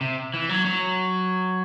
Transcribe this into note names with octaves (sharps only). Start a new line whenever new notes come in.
C3
E3
F#3
F#3